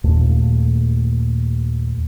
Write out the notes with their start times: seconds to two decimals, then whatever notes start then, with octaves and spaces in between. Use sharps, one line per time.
0.04 D#2 A#2 A3